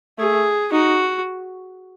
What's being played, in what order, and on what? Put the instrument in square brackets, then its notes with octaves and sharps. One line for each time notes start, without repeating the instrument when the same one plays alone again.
[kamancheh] A3 [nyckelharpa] G#4
[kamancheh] D#4 [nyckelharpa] F#4